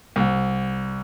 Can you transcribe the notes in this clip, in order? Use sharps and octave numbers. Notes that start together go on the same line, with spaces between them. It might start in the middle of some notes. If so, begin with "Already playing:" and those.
C2